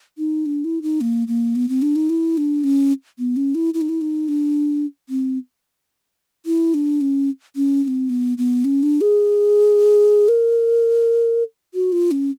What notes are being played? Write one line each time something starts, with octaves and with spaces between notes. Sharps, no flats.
D#4
D4
E4
D#4
A#3
A#3
B3
C4
D4
D#4
E4
D4
C#4
B3
C#4
E4
E4
D#4
E4
D#4
D4
C4
E4
D4
C#4
C#4
C#4
C4
B3
B3
C#4
D4
G#4
A#4
F#4
F4
C#4